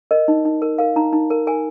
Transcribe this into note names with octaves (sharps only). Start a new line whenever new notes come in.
A#4 D#5
D#4
D#4
A#4
A#4 F5
D#4 A#5
D#4
A#4
A#4 G#5